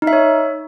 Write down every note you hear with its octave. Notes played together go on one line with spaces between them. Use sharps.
D#4
E5
C#5